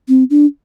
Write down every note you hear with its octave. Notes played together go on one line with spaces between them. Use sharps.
C4
D4